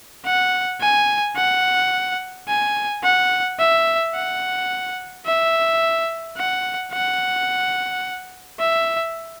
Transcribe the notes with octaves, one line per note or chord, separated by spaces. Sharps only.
F#5
G#5
F#5
G#5
F#5
E5
F#5
E5
F#5
F#5
E5